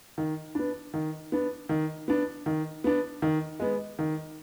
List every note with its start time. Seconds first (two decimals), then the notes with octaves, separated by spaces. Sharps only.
0.18 D#3
0.55 B3 D4
0.94 D#3
1.32 B3 D4
1.69 D#3
2.08 B3 D4
2.46 D#3
2.84 B3 D4
3.22 D#3
3.60 G#3 B3
3.99 D#3